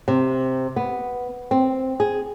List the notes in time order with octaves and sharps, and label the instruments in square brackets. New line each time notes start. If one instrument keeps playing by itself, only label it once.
[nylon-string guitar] C3
B3
C4
G#4